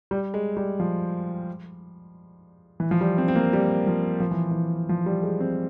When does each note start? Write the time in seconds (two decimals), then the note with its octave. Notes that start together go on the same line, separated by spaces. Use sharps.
0.11 G3
0.34 G#3
0.57 G3
0.80 F3
2.80 E3
2.91 F3
3.01 G3
3.18 C4
3.28 C4
3.36 A#3
3.53 G3
3.87 F3
4.20 F3
4.31 E3
4.51 E3
4.89 F3
5.06 G3
5.23 G#3
5.40 C4